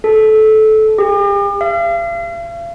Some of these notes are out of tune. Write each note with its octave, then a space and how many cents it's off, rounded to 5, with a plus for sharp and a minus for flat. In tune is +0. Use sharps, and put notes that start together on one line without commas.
A4 -20
G4 +40
F5 -40